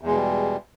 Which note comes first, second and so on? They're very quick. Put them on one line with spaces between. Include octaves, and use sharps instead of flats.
E2 G#3 B2 G3